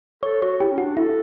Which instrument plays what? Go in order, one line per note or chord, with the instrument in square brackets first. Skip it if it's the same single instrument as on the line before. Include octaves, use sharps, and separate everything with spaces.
[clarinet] A4 [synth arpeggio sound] C#5
[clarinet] F#4 [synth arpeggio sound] C#5
[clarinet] E4 [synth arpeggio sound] G4
[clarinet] C#4
[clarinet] D4 [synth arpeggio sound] F#4
[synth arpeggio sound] E4 [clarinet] A4